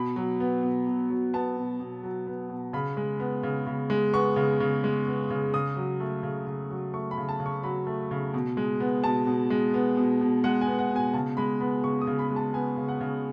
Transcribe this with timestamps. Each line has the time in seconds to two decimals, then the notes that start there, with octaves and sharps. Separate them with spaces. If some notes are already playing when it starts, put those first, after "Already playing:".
Already playing: B2 B5
0.16 F#3
0.40 B3
0.63 B2
0.87 B2
1.10 F#3
1.34 B3 A5
1.57 B2
1.80 B2
2.03 F#3
2.27 B3
2.50 B2
2.73 C#3 B5
2.97 G#3
3.20 B3
3.43 C#3
3.67 C#3
3.90 G#3
4.13 B3 C#6
4.36 C#3
4.60 C#3
4.84 G#3
5.07 B3
5.30 C#3
5.54 C#3 D#6
5.77 F#3
6.00 A3
6.23 C#3
6.47 C#3
6.70 F#3
6.94 A3 C#6
7.11 B5
7.18 C#3
7.29 A5
7.40 C#3
7.46 C#6
7.63 F#3 B5
7.87 A3
8.11 C#3
8.34 B2
8.57 G#3
8.80 B3
9.04 B2 A5
9.27 B2
9.50 G#3
9.74 B3
9.97 B2
10.21 B2
10.44 G#3 F#5
10.61 G#5
10.67 B3
10.79 F#5
10.91 B2 G#5
11.14 C#3 A5
11.37 G#3 B5
11.60 B3 B5
11.84 C#3 C#6
12.01 D#6
12.07 C#3
12.19 B5
12.30 G#3
12.36 A5
12.54 B3 G#5
12.77 C#3
12.88 F#5
13.01 C#3